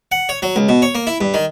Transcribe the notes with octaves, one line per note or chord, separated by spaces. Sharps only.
F#5
C#5
F#3
C#2
B2
C#5
A#3
E4
G2
D#3